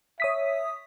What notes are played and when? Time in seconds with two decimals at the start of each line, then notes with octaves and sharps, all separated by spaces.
0.20 C#5 E5 D#6 B6